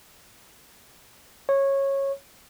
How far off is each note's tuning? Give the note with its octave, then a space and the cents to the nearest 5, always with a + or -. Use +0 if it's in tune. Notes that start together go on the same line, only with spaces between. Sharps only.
C#5 -15